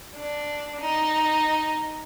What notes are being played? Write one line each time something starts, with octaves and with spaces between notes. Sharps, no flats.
D4
D#4